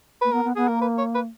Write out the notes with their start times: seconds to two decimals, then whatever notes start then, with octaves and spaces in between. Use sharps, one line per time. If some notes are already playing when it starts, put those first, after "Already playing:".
0.21 A#3 B4
0.32 B3 A#4
0.45 B3
0.56 B3 G#4
0.68 A#3 A#4
0.81 B4
0.98 C#5
1.15 B4